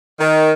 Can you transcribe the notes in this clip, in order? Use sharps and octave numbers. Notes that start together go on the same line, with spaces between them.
D#3